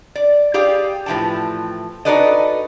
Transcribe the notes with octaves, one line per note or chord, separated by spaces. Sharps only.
D5
G4 G#4 D5 F5 G5
A2 E3 F3 G5 A5
D#4 F#4 A4 B4 D5 D#5